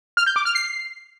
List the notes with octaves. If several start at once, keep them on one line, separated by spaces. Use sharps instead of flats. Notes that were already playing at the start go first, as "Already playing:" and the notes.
F6
G6
D6
F6
C7